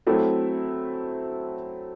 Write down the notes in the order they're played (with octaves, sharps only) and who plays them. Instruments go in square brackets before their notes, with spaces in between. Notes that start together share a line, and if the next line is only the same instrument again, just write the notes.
[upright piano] F#3 A3 C4 E4 A4